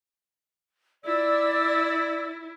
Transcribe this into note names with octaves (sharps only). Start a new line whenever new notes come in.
E4 D5 E6